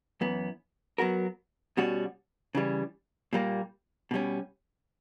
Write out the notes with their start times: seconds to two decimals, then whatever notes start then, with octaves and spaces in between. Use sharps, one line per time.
0.21 F#2 E3 B3
0.98 F#3 B3 F#4 A#4
1.77 B2 G3 C#4 F#4
2.55 C#3 E3 G3
3.33 A#2 G3 A#3
4.11 B2 G3 C#4